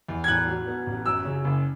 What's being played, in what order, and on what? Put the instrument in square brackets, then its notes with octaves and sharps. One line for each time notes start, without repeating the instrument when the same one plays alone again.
[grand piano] E2
[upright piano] G#6
[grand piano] A2 [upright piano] F#6
[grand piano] F#3
B3
A1
[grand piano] F#2 [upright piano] E6
[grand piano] C#3
F#1